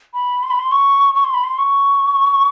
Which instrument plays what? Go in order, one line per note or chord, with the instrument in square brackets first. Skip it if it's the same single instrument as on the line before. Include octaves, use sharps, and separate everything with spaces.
[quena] B5
C6
B5
C6
C#6
C#6
C6
B5
C6
C#6